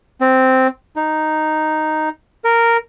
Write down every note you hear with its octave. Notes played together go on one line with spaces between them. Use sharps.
C4
D#4
A#4